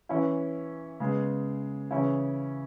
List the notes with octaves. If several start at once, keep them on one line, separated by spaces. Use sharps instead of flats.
E3 C#4 E4
C#3 G#3 B3
C#3 E3 C#4 E4